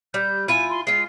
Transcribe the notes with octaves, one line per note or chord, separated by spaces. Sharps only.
G3 G6
E4 F4 G#5 D#7
C6
G#3 F4 C7